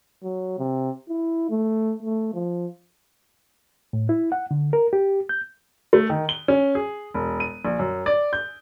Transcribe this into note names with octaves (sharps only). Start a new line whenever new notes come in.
F#3
C3
E4
A3
A3
F3
A2
E4
F#5
D3
A#4
G4
G6
A3
D#3
G7
C#4
G#4
E1
D#7
A#1
F#2
D5
G6